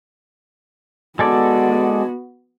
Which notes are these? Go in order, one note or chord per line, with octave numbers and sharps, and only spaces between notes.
G#3 B3 F#4 A4 D5